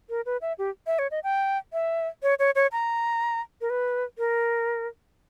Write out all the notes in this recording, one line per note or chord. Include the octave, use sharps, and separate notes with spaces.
A#4
B4
E5
G4
E5
C#5
D#5
G5
E5
C#5
C#5
C#5
A#5
A#4
B4
A#4